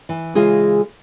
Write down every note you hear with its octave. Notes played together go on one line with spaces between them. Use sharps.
E3
C#3 E3 G#3 F4 G#4